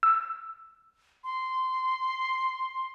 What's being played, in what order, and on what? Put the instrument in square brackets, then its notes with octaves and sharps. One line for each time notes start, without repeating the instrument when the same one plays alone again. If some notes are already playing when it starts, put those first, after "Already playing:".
[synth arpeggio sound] E6
[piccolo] C6